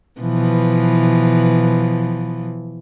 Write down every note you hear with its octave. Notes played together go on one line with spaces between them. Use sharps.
B2 E3 F3